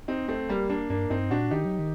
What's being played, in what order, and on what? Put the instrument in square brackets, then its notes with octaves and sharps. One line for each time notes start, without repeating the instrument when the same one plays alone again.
[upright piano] C4 D#4
A3 C4
G3 A#3
A#3 D4
[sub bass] G2 [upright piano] A#3 D4
[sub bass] G2 [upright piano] C4 D#4
[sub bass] A#2 [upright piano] D4 F#4
[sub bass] D#3 [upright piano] D#4 G4
[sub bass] F#3
D#3